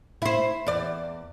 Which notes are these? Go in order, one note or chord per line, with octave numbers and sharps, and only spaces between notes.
E4 C5
E2 D5